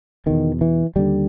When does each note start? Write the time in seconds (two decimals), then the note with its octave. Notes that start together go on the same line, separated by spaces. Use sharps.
0.26 E2 B2 D#3
0.61 E3
0.96 D#2 D3 G3